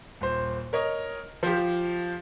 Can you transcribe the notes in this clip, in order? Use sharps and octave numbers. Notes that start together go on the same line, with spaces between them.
D#1 C5
A#4 C#5 D#5
F3 F4 G4